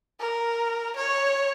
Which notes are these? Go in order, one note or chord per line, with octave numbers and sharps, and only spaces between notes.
A#4
C#5